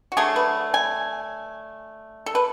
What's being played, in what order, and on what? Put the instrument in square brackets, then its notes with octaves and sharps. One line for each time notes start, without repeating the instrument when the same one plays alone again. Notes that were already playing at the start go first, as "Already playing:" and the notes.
[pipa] F#4
D3 F#3 A3 G#4
B4
G#5
A4
B4